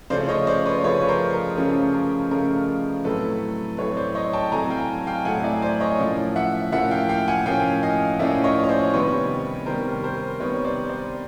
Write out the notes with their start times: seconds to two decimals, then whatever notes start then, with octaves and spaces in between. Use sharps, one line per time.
0.10 C#3 F3 A3 C#4 C5 D5
0.28 C#5 D#5
0.47 C5 D5
0.65 B4 C#5
0.84 C#3 F3 A3 C#4 B4 C#5
1.02 B4
1.08 A#4 C5
1.33 A#4
1.58 C#3 F3 A3 C#4 A#4
1.94 A#4
2.31 C#3 F3 A3 C#4 A#4
3.04 A2 F#3 A3 C4 A4 B4
3.78 A2 F#3 A3 C4 B4 C#5
3.97 C5 D5
4.15 C#5 D#5
4.33 G5 A5
4.52 A2 F#3 A3 C4 G#5 A#5
4.70 F5 G5
5.07 F5 G5
5.25 A2 F#3 A3 C4 F#5 G#5
5.43 D5 E5
5.62 C5 D5
5.80 C#5 D#5
5.99 A2 F3 A#3 C#4
6.36 E5 F#5
6.72 A2 F3 A#3 C#4 E5 F#5
6.91 F5 G5
7.09 F5 G5
7.28 F#5 G#5
7.46 A2 F3 A#3 C#4 F5 G5
7.83 D#5 F5
8.19 A2 F3 A#3 C#4 D5 E5
8.44 C#5 D#5
8.64 C#5
8.69 C5 D5
8.93 C3 D#3 G3 B3 B4 C#5
9.66 C3 D#3 G3 B3 A#4 C5
10.03 A#4 C5
10.40 C3 D#3 G3 B3 B4 C#5
10.64 C5 D5
10.89 C5 D5